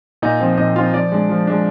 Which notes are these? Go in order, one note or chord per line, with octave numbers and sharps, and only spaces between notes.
A#2 D#4 D#5
F3 C4 D#4
A#2 D#4 D#5
F3 C4 D#4 F4 F5
F3 D5
G#3 D4
F3
G#3 D4